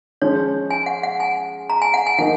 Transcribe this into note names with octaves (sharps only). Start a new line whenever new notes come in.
F3 G#3 C#4 C#5
G#5
F#5
F#5
G#5
A#5
G#5
F#5
G#5
F3 A#3 D#4 F#5